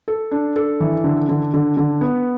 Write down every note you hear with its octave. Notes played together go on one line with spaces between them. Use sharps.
A4
D4
A4
E3
D3
D3
D3
D3
B3